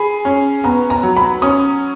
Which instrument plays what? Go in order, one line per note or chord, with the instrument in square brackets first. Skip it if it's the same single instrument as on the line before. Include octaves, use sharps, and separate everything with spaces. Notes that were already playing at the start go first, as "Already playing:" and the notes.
Already playing: [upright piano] G#4 [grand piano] B5
[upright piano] C#4
[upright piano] B3 [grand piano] A#5
[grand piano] A#5
[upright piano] F#3
[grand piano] B5
[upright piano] C#4 [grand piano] D#6